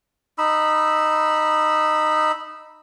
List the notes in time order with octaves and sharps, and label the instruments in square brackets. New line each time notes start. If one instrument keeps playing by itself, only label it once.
[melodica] D#4 B5 E6